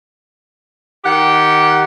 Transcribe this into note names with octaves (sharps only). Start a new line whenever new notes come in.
D#3 G4 F#5